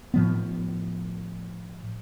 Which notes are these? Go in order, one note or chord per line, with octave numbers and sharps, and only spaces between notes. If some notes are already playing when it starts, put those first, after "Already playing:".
A2 F3 B3